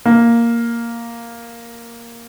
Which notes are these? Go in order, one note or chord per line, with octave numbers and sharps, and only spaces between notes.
A#3